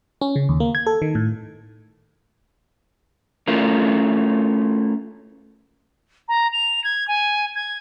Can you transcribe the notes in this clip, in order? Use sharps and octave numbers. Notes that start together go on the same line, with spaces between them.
C#4
C#3
D#2
A#3
G#6
A4
D#3
A2
A3 C#4 E4 F4 A#4
A#5
F7
G#6
G#5
G#6